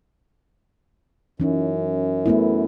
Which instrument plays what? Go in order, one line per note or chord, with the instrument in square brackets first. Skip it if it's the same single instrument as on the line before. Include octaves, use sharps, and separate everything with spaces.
[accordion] F#2 [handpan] E3 C#4 D#4
[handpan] A3 B3 E4